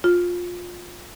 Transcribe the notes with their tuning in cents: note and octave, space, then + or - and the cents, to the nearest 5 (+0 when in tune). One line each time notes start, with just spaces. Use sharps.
F4 +15